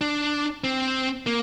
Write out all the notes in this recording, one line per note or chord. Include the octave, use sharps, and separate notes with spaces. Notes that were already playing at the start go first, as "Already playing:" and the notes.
D4
C4
A#3